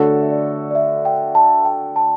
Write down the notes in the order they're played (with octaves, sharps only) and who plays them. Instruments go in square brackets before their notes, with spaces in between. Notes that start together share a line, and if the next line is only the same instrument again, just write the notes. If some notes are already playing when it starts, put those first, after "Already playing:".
Already playing: [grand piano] D3 A3 D4 F#4 A4 [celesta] C#5
[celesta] E5
D5
D5
E5
G5
A5
G5
A5